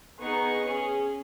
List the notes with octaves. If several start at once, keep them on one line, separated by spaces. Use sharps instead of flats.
B3 D#4 G#4 C#6
C#4 G#4